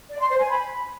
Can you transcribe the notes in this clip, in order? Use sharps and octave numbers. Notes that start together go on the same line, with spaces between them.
D5
C6
C5
G#5
B5